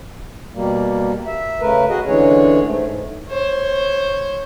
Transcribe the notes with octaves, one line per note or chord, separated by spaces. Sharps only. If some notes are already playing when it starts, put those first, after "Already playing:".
B2 G3 A#3
E5
C#3 A3 A#4 B4
F#4 G#4 D#5
D3 E3 G#3 C#4 G#4 C#5
G#2 A3
C5 C#5